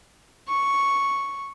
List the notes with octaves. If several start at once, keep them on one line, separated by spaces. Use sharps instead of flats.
C#6